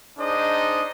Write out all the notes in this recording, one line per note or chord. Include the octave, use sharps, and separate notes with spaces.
D4 D#4 G#4 C5 D#5